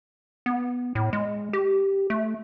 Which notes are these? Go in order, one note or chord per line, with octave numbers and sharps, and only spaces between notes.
B3
A2
G#3
G4
A3